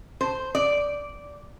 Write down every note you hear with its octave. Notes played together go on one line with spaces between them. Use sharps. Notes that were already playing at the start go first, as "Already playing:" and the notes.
C5
D5